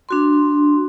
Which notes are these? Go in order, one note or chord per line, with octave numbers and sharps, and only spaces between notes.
D4 F#4 C6